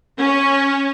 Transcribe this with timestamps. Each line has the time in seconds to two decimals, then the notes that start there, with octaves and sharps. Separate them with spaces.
0.18 C#4